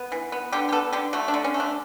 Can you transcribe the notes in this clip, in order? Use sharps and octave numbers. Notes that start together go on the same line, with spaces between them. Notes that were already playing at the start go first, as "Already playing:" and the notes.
Already playing: B3
E3
B3
D3 G4
G4
B3 A4
D3 G4
A3 F#4
D4
D3
C#4
A3
D4